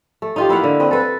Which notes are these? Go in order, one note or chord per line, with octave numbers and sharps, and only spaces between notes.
A3
D#4 F4 G4
A#3 E4 F5 F#5
D3
C4 B4 D#5
A4 B4